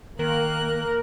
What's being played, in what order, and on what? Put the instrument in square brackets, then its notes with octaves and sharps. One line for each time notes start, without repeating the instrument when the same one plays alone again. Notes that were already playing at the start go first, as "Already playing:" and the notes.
[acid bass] D#3 [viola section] A#3 [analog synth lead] A#4 [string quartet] F#6